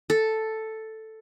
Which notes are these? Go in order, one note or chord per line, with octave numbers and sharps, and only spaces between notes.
A4